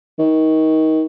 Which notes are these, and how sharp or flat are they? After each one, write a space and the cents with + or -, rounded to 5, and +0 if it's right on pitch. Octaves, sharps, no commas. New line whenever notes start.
D#3 +25